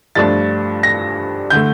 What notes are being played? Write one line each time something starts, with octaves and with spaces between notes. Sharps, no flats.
G2 F3 A3 D4 A6
A#6
D3 A3 G6